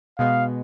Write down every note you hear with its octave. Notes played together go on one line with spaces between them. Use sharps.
B2 G#3 B3 F5